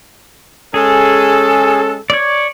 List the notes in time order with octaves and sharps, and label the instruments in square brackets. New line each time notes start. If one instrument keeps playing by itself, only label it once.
[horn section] G#3 C#4 A4 [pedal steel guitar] G#4
[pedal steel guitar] C#5 D5